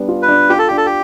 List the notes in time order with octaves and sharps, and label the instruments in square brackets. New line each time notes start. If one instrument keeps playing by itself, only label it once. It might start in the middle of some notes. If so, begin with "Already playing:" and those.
Already playing: [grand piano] G3 B3 D4
F4
[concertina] B4
[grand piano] D4
[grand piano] F4 [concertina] G4
[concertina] A4
[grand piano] D4 [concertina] G4
[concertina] A4
G4